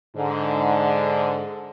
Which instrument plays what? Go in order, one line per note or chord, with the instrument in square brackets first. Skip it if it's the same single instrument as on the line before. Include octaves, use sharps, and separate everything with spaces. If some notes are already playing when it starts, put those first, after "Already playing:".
[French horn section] G#2 D3